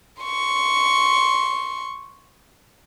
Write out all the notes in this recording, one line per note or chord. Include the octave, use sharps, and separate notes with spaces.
C6 C#6